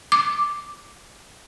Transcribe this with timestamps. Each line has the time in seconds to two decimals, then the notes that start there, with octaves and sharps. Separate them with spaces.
0.12 D6